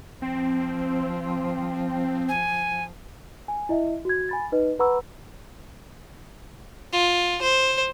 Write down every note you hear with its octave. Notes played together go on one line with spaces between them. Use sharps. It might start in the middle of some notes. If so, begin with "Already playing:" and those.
F3 C4
G#5
G#5
E4 D#5 E5
F#4 G#6
G#5 B5 A6
D#4 B4 D#5
B4 F#5 A#5 B5 C#6 E6
F4
C5